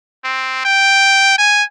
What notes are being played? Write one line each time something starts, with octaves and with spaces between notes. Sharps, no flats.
C4
G5
G#5